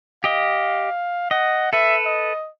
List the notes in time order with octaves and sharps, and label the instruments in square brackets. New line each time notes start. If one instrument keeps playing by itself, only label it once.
[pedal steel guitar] G4 D#5 [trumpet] F5
[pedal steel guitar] D#5 [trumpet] F#5
[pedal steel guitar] A4 B4 [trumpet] E5
[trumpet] D#5